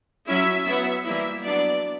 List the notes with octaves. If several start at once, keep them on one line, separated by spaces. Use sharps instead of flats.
F#3 C#4 E4 E5
F#3 B3 E4 E5
E3 G3 A#3 E4 E5
F#3 B3 D4 D5